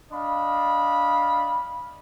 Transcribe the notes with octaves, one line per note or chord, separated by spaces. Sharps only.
D4 D#5 F5 B5